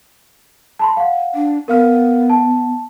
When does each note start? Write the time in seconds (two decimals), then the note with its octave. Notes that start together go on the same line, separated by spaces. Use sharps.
0.79 A5 B5 C6
0.97 F5 F#5
1.35 D4
1.68 B3 A#4 F5 F6
2.30 A5